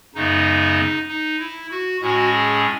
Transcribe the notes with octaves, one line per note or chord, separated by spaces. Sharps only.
F#2 C#3 G#3 B3 D#4
D#4
E4
F#4
A2 G#3 C#4 F#4
G#4